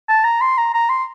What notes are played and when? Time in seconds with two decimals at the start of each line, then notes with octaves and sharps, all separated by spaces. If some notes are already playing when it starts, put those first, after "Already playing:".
0.09 A5
0.24 A#5
0.41 C6
0.58 A#5
0.74 A#5
0.89 C6